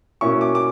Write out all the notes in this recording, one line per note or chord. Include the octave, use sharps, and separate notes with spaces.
B2 A#3 C#4 E4 C#6
D6
D6